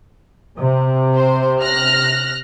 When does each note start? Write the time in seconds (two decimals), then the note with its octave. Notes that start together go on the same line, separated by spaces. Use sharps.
0.57 C3
1.15 C5
1.62 F6 F#6 A#6